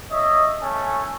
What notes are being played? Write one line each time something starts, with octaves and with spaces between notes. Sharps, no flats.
C#5 D#5 E5
A3 C#4 G#5